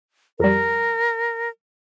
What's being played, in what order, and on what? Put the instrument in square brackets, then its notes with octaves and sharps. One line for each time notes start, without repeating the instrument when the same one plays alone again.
[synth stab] F2 G3 [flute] A#4